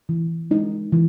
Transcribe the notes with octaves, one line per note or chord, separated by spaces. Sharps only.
E3
G#3 D#4
E3